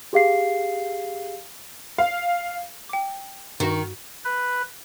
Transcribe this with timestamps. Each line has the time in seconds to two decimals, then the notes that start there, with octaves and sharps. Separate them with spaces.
0.13 G4 G#4 F5 C7
1.98 F5
2.89 G5 D6
3.60 G2 D#3 F#4
4.25 B4